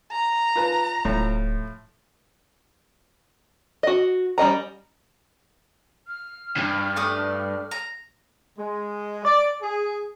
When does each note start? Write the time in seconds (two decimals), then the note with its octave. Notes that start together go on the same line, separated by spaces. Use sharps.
0.12 A#5
0.56 F4 B4 A5
1.05 D1 A2 F3
3.83 F#4 D#5
4.38 G3 C#4 D#5 A#5
6.07 F6
6.56 C#2 G2
6.96 A3 D5 D#6
7.71 A#5
8.57 G#3
9.24 D5
9.62 G#4